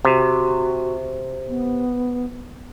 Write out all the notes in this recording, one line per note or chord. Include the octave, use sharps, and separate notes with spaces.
C3 F#4
B3